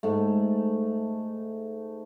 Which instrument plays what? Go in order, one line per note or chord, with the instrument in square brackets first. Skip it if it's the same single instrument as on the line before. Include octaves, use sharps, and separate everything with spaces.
[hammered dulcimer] G#2 A3